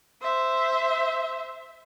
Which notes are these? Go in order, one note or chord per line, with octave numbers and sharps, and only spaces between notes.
C5 E5